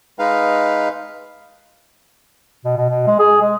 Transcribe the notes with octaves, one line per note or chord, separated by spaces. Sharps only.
G#3 D#4 B4 F5
B2
B2
B2
G#3
G#4
G#3